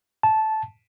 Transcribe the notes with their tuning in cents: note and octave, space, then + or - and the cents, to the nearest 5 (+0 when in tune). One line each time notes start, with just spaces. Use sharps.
A5 -10